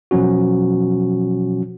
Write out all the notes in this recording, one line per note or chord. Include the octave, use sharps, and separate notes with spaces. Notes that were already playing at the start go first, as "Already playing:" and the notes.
B2 F3 F#3 C#4 F#4